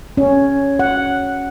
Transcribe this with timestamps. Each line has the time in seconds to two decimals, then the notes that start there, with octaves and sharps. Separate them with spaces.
0.17 C#4
0.79 F#5